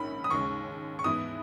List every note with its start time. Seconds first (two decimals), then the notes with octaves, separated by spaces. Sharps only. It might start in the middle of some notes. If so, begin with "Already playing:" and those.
Already playing: A#1 G#2 D#3 A#3 C#4 B5
0.24 D#6
0.30 D#2 C#3 G#3 C#6
0.99 C#6
1.04 G#2 E3 B3 E4 D#6